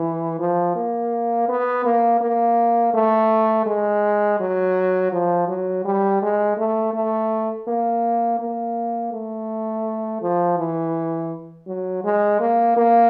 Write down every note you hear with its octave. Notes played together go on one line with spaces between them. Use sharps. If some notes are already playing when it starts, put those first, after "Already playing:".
Already playing: E3
F3
A#3
B3
A#3
A#3
A3
G#3
F#3
F3
F#3
G3
G#3
A3
A3
A#3
A#3
A3
F3
E3
F#3
G#3
A#3
A#3